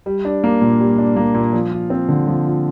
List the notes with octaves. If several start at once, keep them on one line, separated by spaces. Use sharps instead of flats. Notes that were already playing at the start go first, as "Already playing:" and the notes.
G3
D4
A#3
A#2
G3
D4
A#3
A#2
F3
F4
C4
D3
F3
F4